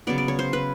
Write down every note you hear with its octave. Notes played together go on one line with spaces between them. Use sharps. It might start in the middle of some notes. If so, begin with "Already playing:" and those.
C#3 F#3 B3 D5
D5
C#5
C5
B4